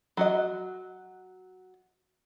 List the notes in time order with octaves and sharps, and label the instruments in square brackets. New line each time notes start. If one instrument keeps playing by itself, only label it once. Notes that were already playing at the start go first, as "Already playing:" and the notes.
[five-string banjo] F#3 F#4 D#5